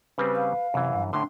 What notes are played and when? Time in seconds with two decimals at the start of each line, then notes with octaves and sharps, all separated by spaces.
0.18 C#3 G3 C4 B4
0.36 F5
0.74 F#2 C3 E3
0.94 G2
1.13 A2 D3 D4 C6